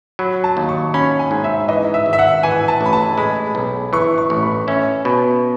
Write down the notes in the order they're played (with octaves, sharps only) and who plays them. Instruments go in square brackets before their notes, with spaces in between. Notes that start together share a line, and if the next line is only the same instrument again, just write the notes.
[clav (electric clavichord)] F#3 [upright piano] B5
[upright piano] A5
[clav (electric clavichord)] D#2
[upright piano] C#6
[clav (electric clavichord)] C#4 [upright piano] B5
[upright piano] G#5
[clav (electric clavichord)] G#2
[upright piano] E5
[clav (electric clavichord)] E3 [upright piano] D#5
[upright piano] E5
[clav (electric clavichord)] G#1
[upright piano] E5
F#5
[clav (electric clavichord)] E3 [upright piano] G#5
[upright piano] A5
[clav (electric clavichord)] A1 [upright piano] B5
[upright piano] A5
[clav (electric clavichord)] G#3 [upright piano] B5
[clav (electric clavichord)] B1
[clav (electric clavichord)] E3 [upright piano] C#6
[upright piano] C#6
[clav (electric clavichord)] A1
[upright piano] B5
[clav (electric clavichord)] C#4 [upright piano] E5
[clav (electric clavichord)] B2